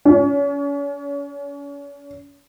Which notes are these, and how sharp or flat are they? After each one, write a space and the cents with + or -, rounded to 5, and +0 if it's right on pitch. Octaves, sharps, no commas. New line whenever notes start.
C#4 +35